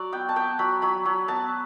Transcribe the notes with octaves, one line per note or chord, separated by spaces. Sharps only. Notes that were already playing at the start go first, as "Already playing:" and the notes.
Already playing: F#3 D5
B3 G5
A5
B3 G5
F#3 B5
F#3 B5
F#3
B3 A5